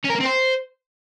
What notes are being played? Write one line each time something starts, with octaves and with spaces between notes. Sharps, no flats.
C#4
A#4
A#3
C4
C5